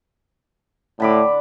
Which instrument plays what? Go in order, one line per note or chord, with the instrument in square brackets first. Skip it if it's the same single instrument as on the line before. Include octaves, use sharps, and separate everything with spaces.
[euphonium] A2 [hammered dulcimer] D3 B5 D6